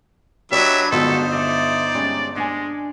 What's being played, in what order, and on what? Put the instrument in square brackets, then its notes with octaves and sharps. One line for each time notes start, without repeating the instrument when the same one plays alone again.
[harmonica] F#3 D4 B4 [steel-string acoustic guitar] G4 C#5 D#5 [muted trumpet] E5
[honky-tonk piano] G1 [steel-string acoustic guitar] F#3 G#3 F4 [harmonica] D#4 C5 [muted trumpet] A4
[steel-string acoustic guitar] D3 E5 [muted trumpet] D5
[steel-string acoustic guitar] G3 G#3 C#4
[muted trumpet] G#3 [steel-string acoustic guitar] D4 F#5 G#5